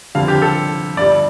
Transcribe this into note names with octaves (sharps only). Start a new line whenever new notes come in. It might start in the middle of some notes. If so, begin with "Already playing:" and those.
F1 F2 D3 G3 F5
G4
A4
G1 G2 G3 D5